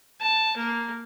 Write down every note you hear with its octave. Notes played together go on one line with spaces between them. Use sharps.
A5
A#3